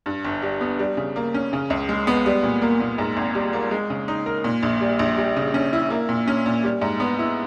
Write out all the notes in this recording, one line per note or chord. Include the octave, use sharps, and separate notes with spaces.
G2
G1
G3
B3
G3
C#3
A#3
C#4
C#3
C#2
G#3
B3
G3
A#2
A#3
A#2
G#2
G#1
G3
A#3
G#3
C#3
D#4
A#4
A#2
A#1
G3
A#1
G3
C#3
C#4
E4
A#3
A#2
C#4
A#2
G3
G#2
B3
E4